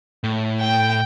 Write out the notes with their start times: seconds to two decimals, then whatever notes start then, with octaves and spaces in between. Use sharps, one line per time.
0.24 A2
0.62 G5